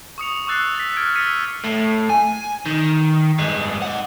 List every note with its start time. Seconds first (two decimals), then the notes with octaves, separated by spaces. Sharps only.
0.18 C#6 D#6 C#7 F7
0.47 C#6 D6 E6 F#6 A6 C7
0.75 A6 B6
0.97 F6 F#6 G#6 D7
1.15 E6 F6 A6 B6 C#7 D#7
1.64 A2
2.09 G#5
2.66 D#3
3.38 G2 G#3
3.82 D#4 F#5